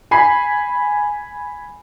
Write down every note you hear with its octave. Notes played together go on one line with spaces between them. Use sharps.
G#5 B5 C7